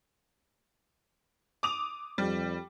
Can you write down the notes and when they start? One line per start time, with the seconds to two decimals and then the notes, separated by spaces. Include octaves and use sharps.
1.63 D6 D#6 F7
2.18 F2 G3